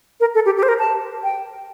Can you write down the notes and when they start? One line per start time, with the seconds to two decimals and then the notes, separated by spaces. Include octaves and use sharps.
0.20 A#4
0.35 A4
0.46 G4
0.57 G4
0.63 C5
0.69 A#4
0.79 A5
1.23 G5